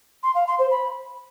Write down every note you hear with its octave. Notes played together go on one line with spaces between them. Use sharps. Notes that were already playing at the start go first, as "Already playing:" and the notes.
C6
F5
C6
C5
B5